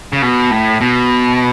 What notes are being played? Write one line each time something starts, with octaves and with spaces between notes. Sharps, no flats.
C#3
B2
A2
B2